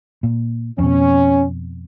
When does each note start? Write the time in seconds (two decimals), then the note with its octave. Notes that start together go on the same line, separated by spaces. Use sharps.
0.23 A#2
0.79 F2 B2 C#4